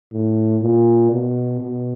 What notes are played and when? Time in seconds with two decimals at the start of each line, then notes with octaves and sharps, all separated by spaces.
0.13 A2
0.62 A#2
1.12 B2
1.61 B2